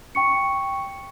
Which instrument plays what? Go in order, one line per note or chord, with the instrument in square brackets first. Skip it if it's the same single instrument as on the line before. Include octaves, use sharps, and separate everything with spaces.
[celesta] G5 C#6 C#7